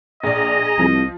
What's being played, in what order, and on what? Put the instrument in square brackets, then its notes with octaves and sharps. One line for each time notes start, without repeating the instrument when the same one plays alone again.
[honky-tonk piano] A#1 D5 [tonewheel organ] G#4 A#5 [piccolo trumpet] D#5
[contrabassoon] C2 [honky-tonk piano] F3